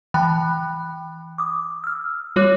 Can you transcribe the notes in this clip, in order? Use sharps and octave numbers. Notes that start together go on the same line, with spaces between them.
E3 G5 B5 F#6
D6 D#6
E6 F6
G3 F4 C#5 D6 F#6